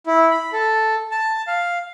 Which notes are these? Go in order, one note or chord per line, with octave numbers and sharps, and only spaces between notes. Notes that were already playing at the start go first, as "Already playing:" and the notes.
E4
B5
A4
A5
F5